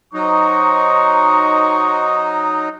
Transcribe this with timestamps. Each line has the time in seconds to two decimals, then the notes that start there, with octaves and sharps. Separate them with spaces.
0.14 F#3 D#4 C5 A#5 C#6